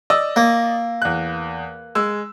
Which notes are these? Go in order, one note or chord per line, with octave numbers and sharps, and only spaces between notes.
D5 D#5 E6
A#3
E2 F#6
G#3 E6